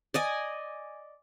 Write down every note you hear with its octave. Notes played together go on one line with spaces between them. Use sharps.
D5 D#5 G#5